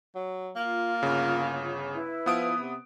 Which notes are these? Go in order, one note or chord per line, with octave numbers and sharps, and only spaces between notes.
F#3
A#3 F4
G1 C#3
E4 B4
F3 B3 D#6 D7
C3